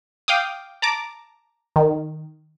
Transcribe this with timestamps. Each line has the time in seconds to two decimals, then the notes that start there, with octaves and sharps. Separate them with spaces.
0.28 F5 G5 D6 D#6
0.82 A5 A#5 D6
1.76 D#3